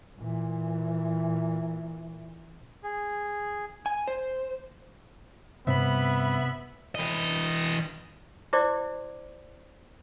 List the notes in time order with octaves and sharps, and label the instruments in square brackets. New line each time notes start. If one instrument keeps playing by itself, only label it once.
[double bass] A#2 E3
[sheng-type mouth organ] G#4
[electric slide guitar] G#5
C5
[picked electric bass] G2 C4 [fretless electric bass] C3 [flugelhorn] B3 [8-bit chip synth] E5 B5
[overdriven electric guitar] E3 D#5
[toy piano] E4 G4 C5 D5 D6